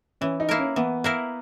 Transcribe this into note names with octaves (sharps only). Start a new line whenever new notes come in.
E3 C#4
D#4
A#3 E4 A#4
C#4
E3 B3
A#3 E4 A#4